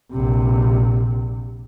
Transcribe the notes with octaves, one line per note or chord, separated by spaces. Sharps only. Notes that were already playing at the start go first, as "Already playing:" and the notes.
A#1 C3